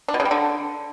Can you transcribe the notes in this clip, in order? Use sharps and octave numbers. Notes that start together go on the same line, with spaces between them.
D4
B2
C#3
G3
D3